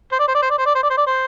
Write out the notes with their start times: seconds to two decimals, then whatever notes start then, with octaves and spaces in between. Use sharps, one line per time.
0.12 C5
0.19 D5
0.28 C5
0.35 D5
0.42 C5
0.50 D5
0.58 C5
0.66 D5
0.75 C5
0.83 D5
0.90 C5
0.97 D5
1.06 C5